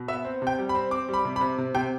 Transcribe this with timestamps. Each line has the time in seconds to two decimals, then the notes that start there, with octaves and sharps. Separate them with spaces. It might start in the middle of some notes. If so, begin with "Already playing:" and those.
Already playing: B2
0.08 B3 E5
0.25 C4
0.42 C3
0.47 G5
0.59 G3
0.69 B5
0.75 C4
0.91 C4 D6
1.09 G3 B5
1.25 C3
1.36 B5
1.41 C3
1.58 C3
1.74 C3 G5